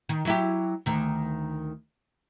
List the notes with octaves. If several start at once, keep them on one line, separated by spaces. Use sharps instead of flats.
D#3
F#3 E4 G4
D2 D#3